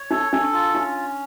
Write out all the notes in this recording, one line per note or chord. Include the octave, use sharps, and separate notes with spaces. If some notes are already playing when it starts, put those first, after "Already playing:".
Already playing: C#5
D#4 A4
D4 A4
F4
C#4 D#4